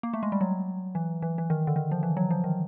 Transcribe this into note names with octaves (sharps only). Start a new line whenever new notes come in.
A#3
A3
G#3
G3
F#3
E3
E3
E3
D#3
D3
D#3
F3
E3
F#3
F3
D#3